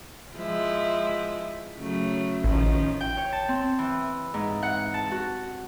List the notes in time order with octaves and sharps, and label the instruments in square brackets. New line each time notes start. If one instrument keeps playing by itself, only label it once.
[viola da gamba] F3 G#3 E4
C#3 F#3 A3
[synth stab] A1 [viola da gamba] D#3 F3 C#4
[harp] G5
C#5
A5
C4
E3
G#2
F#5
A5
F#4